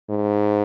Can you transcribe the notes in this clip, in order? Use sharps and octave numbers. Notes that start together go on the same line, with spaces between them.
G#2